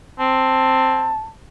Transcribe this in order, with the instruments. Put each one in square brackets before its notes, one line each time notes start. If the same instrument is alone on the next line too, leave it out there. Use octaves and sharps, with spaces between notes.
[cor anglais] C4 [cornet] A5